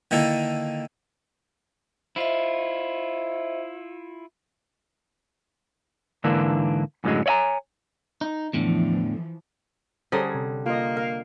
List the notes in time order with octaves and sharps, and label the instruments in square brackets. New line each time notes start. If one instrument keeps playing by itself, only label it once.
[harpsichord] D3 D#3 A#3 E4 A4
[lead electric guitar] E4 F4 [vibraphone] C5 D#5 E5
[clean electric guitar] G#2 D3 E3 A#3 D4
F#2 A2 D3 F3 F#3 G#3
C#5 D5 E5 G#5 A#5
D#4
[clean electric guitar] E2 A2 D3 [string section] E3 F3
[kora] D3 G3 [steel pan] C#4 G#4 D#6 [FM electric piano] C5 A#5 G#6
[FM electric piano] C3
[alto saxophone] A#3 [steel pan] F4 D#5
[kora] A#4 [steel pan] F5